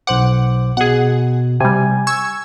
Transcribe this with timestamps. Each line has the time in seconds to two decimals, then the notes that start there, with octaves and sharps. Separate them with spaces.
0.07 B1 C5 F#5 D6
0.77 B2 G#4 F#5
1.60 C3 G3 G#5
2.07 C#6 E6 G#6